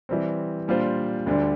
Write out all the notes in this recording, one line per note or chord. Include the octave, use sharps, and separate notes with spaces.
E3 G3 C4
A#2 G3 D4 F4 C5
D2 D3 G3 D4